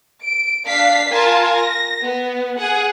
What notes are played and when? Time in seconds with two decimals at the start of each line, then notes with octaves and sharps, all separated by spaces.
0.23 D7
0.66 D4 F5 B6 C7
1.11 F4 A#4 G#5 A5
1.54 A#6
2.04 B3
2.57 G#4 F#5